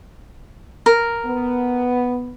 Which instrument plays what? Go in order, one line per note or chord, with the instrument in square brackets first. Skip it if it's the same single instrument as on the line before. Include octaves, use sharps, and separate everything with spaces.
[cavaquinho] A#4
[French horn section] B3